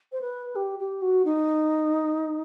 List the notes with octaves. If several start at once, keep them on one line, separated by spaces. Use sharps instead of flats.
C5
B4
G4
G4
F#4
D#4